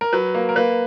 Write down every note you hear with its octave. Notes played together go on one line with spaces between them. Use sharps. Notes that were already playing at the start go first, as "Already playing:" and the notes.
A#4
F#3 B4
A#3
A#4
A#3 B4